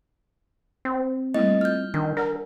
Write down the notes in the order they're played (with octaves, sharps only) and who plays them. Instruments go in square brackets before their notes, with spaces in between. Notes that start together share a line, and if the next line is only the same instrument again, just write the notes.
[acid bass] C4
[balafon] G3 A#3 E4 [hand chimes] A3 D#5
[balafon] F4 [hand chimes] F6 G6
[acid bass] D#3 [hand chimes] D4
[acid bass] A#4 [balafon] D5 F#5